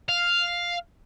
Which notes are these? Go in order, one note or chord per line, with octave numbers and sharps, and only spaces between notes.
F5